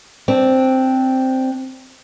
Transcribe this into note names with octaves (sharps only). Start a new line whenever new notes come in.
C4 D4